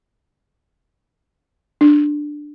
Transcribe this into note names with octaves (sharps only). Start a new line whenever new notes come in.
D4